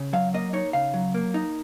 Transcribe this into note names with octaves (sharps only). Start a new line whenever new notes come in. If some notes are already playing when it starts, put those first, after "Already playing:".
Already playing: C#3
F#3 F5
A#3 D#5
D#4 C#5
C#3 F5
F#3
A#3
D#4